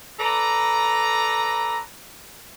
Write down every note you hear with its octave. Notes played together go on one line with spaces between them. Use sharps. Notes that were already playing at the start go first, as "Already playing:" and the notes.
A4 B4 D5 A#5